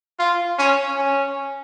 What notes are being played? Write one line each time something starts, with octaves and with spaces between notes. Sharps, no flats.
F4
C#4
C#4